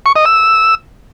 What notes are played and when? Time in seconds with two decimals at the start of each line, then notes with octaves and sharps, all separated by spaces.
0.06 C#6
0.16 D#5
0.25 E6